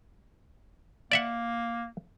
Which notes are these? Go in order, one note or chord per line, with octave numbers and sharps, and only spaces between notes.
A#3 D5 E5 F#5